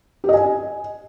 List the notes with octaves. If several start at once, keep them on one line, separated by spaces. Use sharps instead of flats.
G4
D#5
G#5